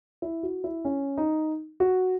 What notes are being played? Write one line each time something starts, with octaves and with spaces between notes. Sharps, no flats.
E4
F#4
E4
C#4
D#4
F#4